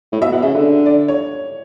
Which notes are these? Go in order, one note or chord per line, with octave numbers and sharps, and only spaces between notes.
A2
B2 E5
B2 F#5
C#3 E5
D3
D5
C#5